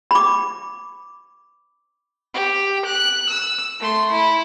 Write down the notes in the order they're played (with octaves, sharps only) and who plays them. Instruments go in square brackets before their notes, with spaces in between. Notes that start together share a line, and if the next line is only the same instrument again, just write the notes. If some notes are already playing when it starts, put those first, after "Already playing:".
[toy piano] B5 D6
[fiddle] G4
F#6
E6
A3 C6
E4